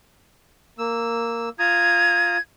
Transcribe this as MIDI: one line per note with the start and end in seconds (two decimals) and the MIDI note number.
0.78 1.49 58
0.78 1.49 88
1.59 2.37 65
1.59 2.37 82
1.59 2.37 87
1.59 2.41 92